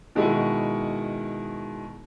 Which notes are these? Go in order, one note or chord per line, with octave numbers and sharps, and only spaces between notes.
B2 D#3 G#3 E4 F#4